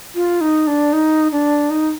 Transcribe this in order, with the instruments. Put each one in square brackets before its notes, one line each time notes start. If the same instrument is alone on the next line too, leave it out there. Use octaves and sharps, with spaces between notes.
[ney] F4
D#4
D4
D#4
D4
D#4